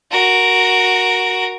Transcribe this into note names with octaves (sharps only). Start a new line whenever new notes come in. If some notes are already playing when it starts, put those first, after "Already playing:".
F#4 A#4